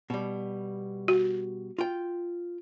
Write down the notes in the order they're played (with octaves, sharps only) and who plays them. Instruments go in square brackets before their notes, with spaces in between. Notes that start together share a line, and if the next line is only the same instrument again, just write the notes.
[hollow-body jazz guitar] B2 G3
[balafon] F#4
[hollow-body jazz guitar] F4 G5